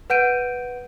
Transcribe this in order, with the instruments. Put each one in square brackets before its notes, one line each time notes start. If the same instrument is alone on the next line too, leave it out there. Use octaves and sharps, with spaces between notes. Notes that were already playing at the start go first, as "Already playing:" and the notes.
[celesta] B4 F#5 G6 D7 D#7